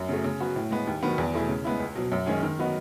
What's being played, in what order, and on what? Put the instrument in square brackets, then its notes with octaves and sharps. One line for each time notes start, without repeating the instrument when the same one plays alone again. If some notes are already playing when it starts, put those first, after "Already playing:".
Already playing: [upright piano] F#2
C#3 F#3 A3
C#3
F#3 B3 F#4
A2
G#3 B3
D#2
D#3 F#3 B3
E2
B2 A3 E4 G#4
C#3
G#3 B3 E4
C#2
B2 F#3
F#2
D#3 G#3 C#4 G#4
D#3
F#3 B3 D#4 F#4